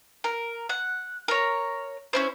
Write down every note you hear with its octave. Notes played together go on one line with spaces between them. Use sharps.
A#4
F#5
A#4 C#5
C#4 E4 C5